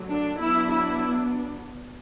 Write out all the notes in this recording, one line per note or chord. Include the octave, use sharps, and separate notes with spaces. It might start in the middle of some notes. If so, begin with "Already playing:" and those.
Already playing: D3 F#3 A3
D4
F#3 B3 D4 E4
E4